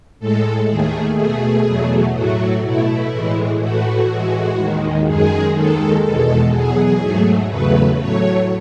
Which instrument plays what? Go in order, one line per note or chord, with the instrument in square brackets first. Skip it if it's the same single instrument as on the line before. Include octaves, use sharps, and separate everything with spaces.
[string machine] A2 G#3 A4
D#2 D#3 A3 G#4
B2 A3 G#4
E2 B2 F#3 A3
A2 F#3 A3 F#4
B2 A3 E4
A2 E3 G#3
A2 E3 A3 F#4
A2 E3 G#3
D#2 D#3 G#3
F#2 D#3 G#3 G#4
D#2 D#3 G#3 A4
E2 B2 G#3 A4
E2 B2 F#3 G#4
G#2 F#3 A3
E2 C#3 F#3 A3 B4
A2 F#3 A3 C#5